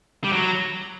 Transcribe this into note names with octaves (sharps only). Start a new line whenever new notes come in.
G3
F#3